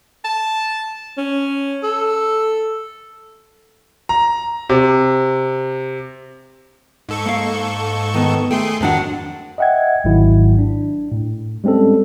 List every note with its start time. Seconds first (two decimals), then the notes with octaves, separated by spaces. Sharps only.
0.24 A5
1.18 C#4
1.83 A4
4.09 A#5
4.70 C3
7.09 G#2 A4 C#6
7.26 A#3 F5
8.14 D#3 B3 A5
8.51 A3 G#4 G5 C6
8.81 F2 D#3 F#3 D4 F#5
9.58 D#5 E5 F#5 G5 G#6
10.04 G#1 G#2 D#3 F#3 E4
10.59 D4
11.12 A2
11.64 G3 G#3 C4 C#4 A4